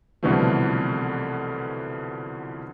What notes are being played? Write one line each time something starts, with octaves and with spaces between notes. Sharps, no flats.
C2 B2 D3 E3 F3 A3